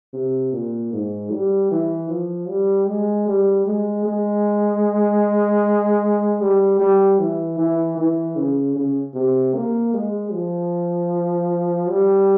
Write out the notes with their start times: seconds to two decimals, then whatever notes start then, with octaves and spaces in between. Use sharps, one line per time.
0.14 C3
0.53 A#2
0.93 G#2
1.31 G3
1.71 E3
2.09 F3
2.49 G3
2.88 G#3
3.28 G3
3.66 G#3
4.05 G#3
6.41 G3
6.80 G3
7.19 E3
7.59 E3
7.98 E3
8.36 C#3
8.76 C#3
9.14 C3
9.55 A#3
9.94 G#3
10.32 F3
11.89 G3